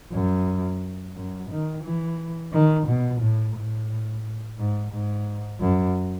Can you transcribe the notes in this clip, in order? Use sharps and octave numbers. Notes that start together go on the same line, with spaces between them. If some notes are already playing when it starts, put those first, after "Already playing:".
F#2
F#2
D#3
E3
D#3
B2
A2
A2
G#2
G#2
F#2